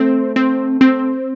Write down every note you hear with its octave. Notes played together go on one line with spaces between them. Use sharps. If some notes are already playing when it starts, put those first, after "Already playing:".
Already playing: A3 C4
C4
C4